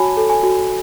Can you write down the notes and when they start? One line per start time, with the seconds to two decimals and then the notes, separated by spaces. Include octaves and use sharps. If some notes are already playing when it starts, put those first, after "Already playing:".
Already playing: F#4 C#5 G#5 A5 B5
0.17 A4
0.29 G#5
0.43 F#4